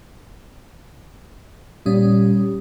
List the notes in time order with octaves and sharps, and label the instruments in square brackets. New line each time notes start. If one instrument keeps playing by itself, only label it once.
[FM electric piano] A#2 C#4 D#6 [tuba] G3